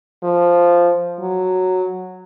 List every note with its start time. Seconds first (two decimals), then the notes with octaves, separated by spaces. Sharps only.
0.23 F3
1.20 F#3